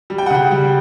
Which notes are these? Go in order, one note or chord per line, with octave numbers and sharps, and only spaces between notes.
G3
G5
F#5
C#3 G5
G3